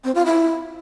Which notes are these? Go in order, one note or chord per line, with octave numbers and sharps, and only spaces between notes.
C4
F4
E4